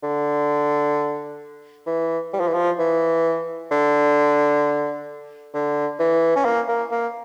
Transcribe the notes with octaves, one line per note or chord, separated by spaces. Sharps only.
D3
E3
G3
F3
E3
F3
E3
D3
D3
E3
C#4
A#3
A#3
A#3